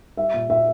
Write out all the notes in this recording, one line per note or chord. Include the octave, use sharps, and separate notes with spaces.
G3 E5
A#2
A#2 E5